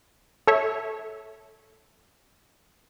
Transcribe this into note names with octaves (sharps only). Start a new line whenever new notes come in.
A4 C#5 E5